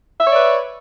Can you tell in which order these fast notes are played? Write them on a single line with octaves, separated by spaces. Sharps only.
E5 C#5 D5 B4